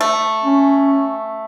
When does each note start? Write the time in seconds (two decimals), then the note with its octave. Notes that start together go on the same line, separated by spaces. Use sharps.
0.01 A3
0.44 C#4